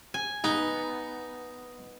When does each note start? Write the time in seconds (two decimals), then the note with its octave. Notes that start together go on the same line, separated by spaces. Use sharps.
0.14 G#5
0.44 B3 D#4